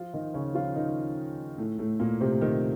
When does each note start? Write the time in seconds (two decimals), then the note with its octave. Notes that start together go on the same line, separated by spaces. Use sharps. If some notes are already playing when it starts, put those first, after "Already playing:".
Already playing: F3 F4
0.13 D#3 D#4
0.34 C#3 C#4
0.55 F3 F4
0.75 D#3 D#4
1.58 A2 A3
1.79 A2 A3
2.00 A#2 A#3
2.21 C3 C4
2.41 D#3 D#4